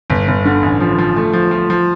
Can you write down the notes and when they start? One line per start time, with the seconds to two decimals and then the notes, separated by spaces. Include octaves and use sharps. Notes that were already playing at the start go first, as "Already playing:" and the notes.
0.10 G1
0.28 G1
0.45 D3
0.62 A1
0.80 F3
0.98 F3
1.16 A3
1.33 F3
1.51 F3
1.70 F3